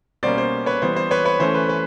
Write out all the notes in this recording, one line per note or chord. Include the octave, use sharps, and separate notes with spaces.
B2 G3 A#3 C#4 C5 D5
C5
B4 C#5
E3 G3 B3 C5
C5
B4 C#5
B4 C#5
E3 A3 C#4 C5
B4
B4